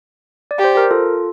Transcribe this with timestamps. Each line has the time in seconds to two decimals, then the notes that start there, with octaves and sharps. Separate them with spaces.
0.51 D5
0.59 G4
0.64 C5
0.77 A#4
0.91 F4 A4